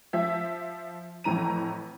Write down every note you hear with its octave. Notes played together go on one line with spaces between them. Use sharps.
F3 E5
F2 A2 E3 A#5 D#7